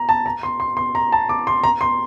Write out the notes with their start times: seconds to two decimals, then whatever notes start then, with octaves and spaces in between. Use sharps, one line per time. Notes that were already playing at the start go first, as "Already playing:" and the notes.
Already playing: A#5
0.09 A5
0.26 A#5
0.43 C6
0.60 C6
0.77 C6
0.95 A#5
1.12 A5
1.29 D6
1.47 C6
1.64 A#5
1.81 C6